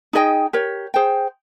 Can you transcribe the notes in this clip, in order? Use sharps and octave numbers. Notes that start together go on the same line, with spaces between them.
D#4 G#4 D#5 G5
G4 A#4 C#5
G#4 C5 G5